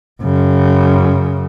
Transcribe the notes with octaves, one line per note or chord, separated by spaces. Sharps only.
F#2 C#3